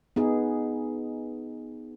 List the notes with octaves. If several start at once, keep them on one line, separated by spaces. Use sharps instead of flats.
B3 D#4 G#4